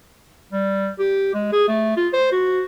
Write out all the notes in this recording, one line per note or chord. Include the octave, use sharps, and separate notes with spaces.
G3
G4
G#3
G#4
A3
F4
C5
F#4